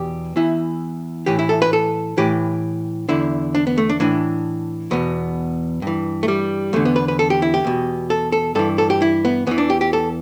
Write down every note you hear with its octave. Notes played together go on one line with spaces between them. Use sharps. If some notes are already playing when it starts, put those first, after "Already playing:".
Already playing: E2 B2 G4
E2 E3 E4
A2 E3 G4
E4
A4
B4
A4
A2 E3 G4
E2 D3 E4
D4
B3
A3
D4
A2 E3 D4
E2 B2 B3
G2 E3
A3
G3
E2 D3 A3
B3
B4
B4
A4
G4
E4
G4
E2 B2
A4
A4
G2 E3 A4
A4
G4
E4
B3
E2 E3 B3
D4
G4
G4
A4